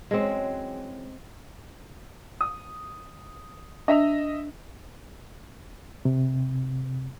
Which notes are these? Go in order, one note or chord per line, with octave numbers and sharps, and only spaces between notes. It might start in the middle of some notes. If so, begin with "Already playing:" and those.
E2 F#3 G#3 C4 C#4
D#6
D4 D#5 E5 F7
C3